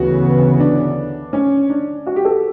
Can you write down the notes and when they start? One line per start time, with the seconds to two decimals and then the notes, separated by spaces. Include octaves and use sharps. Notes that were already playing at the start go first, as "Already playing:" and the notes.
Already playing: D2 C#3 E3 B3 F#4
0.60 D4
1.33 C#4
1.69 D4
2.07 F#4
2.16 G4
2.25 A4